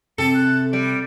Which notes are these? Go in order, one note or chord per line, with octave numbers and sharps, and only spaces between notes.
C3 A4 C#7
F#6
G3 D7